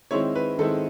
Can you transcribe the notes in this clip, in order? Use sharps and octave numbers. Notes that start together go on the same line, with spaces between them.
D#3 G#3 C4 E4 C#5
B4
D#3 G#3 C4 E4 A4